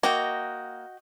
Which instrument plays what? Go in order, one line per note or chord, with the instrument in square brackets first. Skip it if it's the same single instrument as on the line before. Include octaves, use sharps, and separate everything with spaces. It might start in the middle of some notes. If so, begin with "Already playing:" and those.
[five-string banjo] A#3 [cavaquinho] F#4 D#5 G5